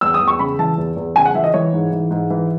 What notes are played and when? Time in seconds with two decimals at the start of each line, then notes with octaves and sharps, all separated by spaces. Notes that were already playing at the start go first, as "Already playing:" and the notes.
0.01 E2 E6
0.14 D#6
0.21 E2
0.28 C#6
0.39 C#3 B5
0.59 E3 A5
0.78 E2
0.97 E2
1.16 C#3 G#5
1.26 F#5
1.34 E3 E5
1.44 D#5
1.54 E3 C#5
1.73 G#2
1.92 E3
2.11 G#2
2.30 E3